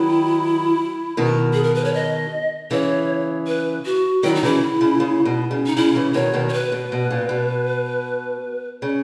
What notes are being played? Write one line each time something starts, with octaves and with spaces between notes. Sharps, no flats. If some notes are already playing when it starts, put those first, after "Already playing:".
Already playing: D#3 F#3 E4
B2 D#3
G#4
A#4
B4
C#5
D#5
C#3 E3 C#5
B4
F#4
D#3 F#3 E4
D#4
C#3 E3 E4
C#3
C#3
B2
C#3
D#4
C#3 E4
C#3 E3
B2 D#3 C#5
B2 D#3
C#5
B4
B2
B2
A#2
B2
C#3